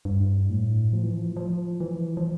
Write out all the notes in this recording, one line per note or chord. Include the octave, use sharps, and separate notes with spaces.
G2
A2
F3
E3
F3
F3
E3
F3